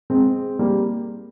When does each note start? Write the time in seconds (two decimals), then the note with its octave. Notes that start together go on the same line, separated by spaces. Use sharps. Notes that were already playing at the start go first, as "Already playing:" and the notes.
0.10 G#3 C4
0.59 G3 A#3